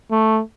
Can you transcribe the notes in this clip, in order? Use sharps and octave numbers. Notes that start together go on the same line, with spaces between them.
A3